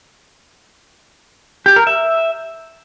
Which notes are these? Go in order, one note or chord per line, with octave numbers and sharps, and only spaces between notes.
G4
A#4
E5